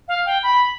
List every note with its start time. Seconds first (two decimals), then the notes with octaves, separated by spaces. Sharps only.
0.08 F5
0.26 G5
0.43 B5